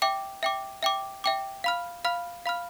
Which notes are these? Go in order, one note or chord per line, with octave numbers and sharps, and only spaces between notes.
E5 G5 D6
E5 G5 D6
E5 G5 D6
E5 G5 D6
F5 B5 F6
F5 B5 F6
F5 B5 F6